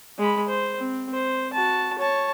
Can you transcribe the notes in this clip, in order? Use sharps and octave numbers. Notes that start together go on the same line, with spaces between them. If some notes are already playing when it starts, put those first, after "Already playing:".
G#3 B5
C5
C4
C5
F#4 A5
C#5 A5